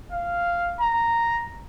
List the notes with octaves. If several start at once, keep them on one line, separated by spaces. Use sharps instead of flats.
F5
A#5